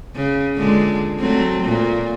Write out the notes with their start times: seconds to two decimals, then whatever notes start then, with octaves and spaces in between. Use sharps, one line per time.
0.16 C#3
0.56 A#2 D3 G#3
1.19 F#3 A3 C4
1.63 A#2 A3